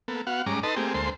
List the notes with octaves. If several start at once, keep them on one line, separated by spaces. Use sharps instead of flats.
A#3 B3 A4
B3 F#4 F5 F#5
G#2 G3 G#3 C#4 A#5 D6
D#4 A4 B4 D#5 A5 C6
A3 A#3 C4 G4 G#4
D2 G#3 A#3 A4 C5 C6